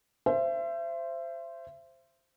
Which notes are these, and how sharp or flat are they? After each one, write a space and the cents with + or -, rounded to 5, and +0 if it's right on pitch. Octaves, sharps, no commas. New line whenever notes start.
C5 +0 E5 +35